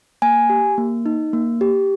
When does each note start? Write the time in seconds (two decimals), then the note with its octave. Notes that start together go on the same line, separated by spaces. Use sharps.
0.22 A#3 G#5
0.50 G4
0.78 A#3
1.06 D#4
1.33 A#3
1.61 G4